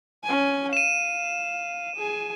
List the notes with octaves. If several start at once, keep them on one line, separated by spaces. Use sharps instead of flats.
C#4 G#5
F5 D#7 E7
G#4 G#5